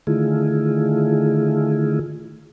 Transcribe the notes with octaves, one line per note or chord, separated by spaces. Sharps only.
D3 D#3 A3 E4 F4 G#4